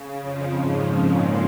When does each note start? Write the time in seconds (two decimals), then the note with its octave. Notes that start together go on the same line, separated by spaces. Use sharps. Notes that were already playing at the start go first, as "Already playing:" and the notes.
Already playing: C#3
0.23 F2 F3
0.58 G#2
0.94 A#2